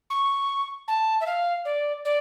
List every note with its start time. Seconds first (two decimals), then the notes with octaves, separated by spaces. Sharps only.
0.10 C#6
0.88 A5
1.21 E5
1.26 F5
1.65 D5
2.05 D5